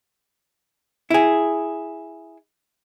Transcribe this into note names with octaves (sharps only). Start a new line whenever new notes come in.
E4 G#4